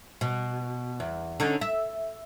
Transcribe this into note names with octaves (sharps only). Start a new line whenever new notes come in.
B2
E2
D3 C#4 D#4
E5